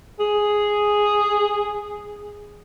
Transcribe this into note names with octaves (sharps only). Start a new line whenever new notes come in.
G#4